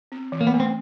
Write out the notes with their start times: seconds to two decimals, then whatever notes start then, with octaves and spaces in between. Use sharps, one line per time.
0.12 C4
0.32 E3
0.41 A#3
0.47 B3
0.53 A3
0.60 C4